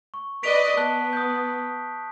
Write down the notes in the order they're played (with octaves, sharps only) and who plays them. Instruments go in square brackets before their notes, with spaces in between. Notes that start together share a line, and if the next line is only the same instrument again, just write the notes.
[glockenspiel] C#6
[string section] B4 D5 D#5 [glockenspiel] B6 D7 F7
[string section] B3 [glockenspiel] A5 F#6 G7
[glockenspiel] D#6 G6